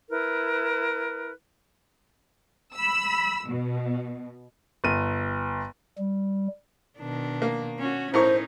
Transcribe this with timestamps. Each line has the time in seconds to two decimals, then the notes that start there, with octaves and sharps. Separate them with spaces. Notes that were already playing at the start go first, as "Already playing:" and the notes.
0.10 E4 A#4 B4
2.75 B5 E6
3.49 B2
4.84 G1 D#7
5.98 G3
6.98 B2 D#3 D4
7.42 A#3
7.79 C#4 F#4
8.14 A2 C#4 D#4 A#4 C5 C#6